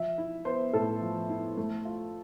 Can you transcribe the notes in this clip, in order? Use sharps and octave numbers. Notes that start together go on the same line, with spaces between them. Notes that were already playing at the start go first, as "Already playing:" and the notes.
Already playing: F3 E5
E4
B3 C5
A2 A4
F3
E4
A3
F4